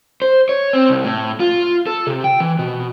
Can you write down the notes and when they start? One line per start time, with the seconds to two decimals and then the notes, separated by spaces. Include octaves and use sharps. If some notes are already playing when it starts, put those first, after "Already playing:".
0.22 C5
0.49 C#5
0.73 C4
0.89 C2
1.04 A2
1.40 F4
1.87 A4
2.07 C3
2.24 G5
2.40 E3
2.59 B2